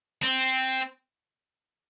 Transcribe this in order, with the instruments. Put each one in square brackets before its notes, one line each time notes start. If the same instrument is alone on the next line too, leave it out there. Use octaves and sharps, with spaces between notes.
[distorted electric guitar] C4